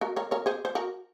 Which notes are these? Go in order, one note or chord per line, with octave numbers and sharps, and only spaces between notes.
F#4 A#4
A#4 C#5
A#4 C#5
G#4 C5
C5
F#4 A#4